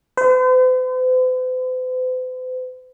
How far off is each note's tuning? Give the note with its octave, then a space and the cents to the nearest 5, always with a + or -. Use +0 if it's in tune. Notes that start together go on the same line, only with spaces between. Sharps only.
C5 -45